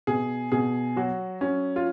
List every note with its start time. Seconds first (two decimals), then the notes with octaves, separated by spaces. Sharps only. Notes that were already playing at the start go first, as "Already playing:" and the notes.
0.07 B2 G#4
0.52 B2 G#4
0.96 F#3 F#4
1.41 F#3 C#4
1.76 F4